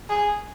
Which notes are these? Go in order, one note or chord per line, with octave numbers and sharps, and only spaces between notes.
G#4